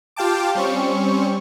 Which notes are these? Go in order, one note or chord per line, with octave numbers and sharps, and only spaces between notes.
F4 G4 F5 G5 A5 D6
G3 C4 C#4 C#6